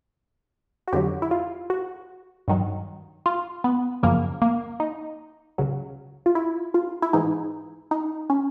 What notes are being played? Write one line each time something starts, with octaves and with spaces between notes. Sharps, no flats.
F#4
F2 D3 F#3 G4
E4
F4
F#4
G2 D#3 F#3
F4
B3
F#2 C#3 F3 A#3
A#3
D#4
C#2 C#3 F#3
F4
E4
F4
E4
G#2 E3 D#4
D#4
C#4